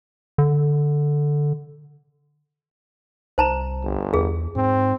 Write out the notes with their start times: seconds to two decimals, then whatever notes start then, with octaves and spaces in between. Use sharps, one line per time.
0.38 D3
3.38 C2 C5 A5 A#5
3.83 G1
4.14 E2 G#4
4.56 G#2 C4